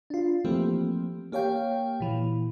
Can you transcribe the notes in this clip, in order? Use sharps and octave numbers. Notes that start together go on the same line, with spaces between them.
D4 F4
E3 F3 A3 A#3 C4 G4
A#3 G4 C#5 F5 G5
A#2 E3